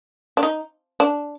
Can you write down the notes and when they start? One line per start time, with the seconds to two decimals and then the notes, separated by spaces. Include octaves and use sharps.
0.37 D4
0.43 D#4
1.00 D4